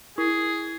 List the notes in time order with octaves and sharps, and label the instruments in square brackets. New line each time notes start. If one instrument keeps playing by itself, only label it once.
[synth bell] E4 [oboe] G#4